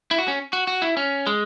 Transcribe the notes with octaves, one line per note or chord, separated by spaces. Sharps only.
E4
F#4
C#4
F#4
F#4
E4
C#4
G#3